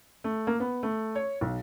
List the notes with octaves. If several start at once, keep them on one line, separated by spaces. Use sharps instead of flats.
A3
A#3
B3
A3
C#5
B1